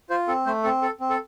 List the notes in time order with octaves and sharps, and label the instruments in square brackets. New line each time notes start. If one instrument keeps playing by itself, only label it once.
[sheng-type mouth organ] F4 C5
C4 A4
A3 C5
C4 A4
A4
C4
A4